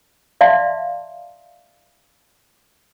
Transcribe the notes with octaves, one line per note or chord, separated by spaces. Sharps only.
D5 E5 F5 A5 C6